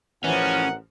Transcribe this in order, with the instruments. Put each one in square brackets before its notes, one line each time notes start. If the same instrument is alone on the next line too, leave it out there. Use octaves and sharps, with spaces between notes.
[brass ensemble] A1 A#4 F#5 [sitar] E3 F3 [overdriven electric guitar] C#4